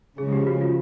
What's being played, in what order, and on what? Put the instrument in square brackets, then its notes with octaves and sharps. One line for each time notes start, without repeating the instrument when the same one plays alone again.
[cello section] C#3 F3 G#3 [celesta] G#4
[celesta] G4
F#4
F4